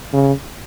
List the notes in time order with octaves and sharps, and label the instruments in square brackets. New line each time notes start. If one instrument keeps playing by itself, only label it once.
[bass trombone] C#3